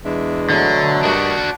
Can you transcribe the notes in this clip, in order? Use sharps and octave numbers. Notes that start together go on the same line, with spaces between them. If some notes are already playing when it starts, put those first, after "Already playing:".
E2 G#3 D4 E5
B2 D3 F#3 A3
G2 D4 F#4 A#4 D#5